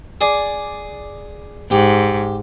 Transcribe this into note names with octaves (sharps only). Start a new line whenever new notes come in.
G#4 D5
G#2 G4